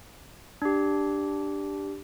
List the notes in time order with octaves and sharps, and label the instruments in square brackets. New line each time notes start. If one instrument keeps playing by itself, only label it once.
[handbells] D4 G4